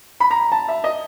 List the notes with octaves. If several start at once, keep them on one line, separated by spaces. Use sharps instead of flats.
B5
A#5
A5
E5
D#5